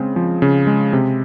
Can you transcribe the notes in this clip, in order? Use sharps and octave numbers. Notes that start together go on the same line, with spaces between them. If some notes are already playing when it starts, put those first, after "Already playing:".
Already playing: C#3 G#3 C4
F3
C#3
G#3
C3